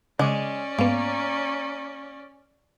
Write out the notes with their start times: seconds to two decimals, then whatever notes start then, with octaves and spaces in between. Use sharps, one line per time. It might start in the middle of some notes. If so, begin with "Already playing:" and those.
0.19 C#3 G#3 C#4 D5 D6
0.79 G#2 A#3 B3